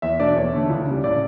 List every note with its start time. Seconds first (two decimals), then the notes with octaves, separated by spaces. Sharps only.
0.02 E2 E5
0.20 B2 A3 D4 D5
0.36 E2 C#5
0.53 D3 A3
0.70 C#2
0.87 C#3 G3
1.04 A2 D5